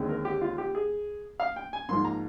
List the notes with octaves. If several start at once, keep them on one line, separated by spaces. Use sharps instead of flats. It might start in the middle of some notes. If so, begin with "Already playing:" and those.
Already playing: D#2 D3 G#3 C4
A#4
G4
F4
G4
G#4
F5
G5
G#5
G#2 F3 A#3 C6
A#5